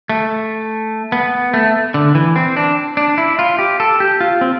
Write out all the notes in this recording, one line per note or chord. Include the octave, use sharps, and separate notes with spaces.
A3
B3
A3
D3
E3
C4
D4
D4
E4
F4
G4
A4
G4
F4
C4